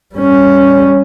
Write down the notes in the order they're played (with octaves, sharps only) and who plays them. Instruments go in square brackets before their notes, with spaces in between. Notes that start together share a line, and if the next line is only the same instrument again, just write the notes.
[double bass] G3 C#4